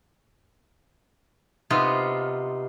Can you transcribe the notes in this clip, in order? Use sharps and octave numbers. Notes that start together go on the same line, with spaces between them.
C3 B3 D#4 F4